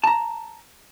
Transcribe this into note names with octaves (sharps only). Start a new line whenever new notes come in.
A5 A#5